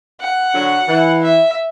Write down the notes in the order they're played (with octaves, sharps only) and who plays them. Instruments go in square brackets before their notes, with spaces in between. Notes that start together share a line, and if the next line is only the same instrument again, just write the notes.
[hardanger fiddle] F#5
[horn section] D3 F#3
E3
[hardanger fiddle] E5